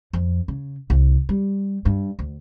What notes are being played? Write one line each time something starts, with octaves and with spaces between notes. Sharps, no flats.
F2
C#3
C2
G3
G2
D2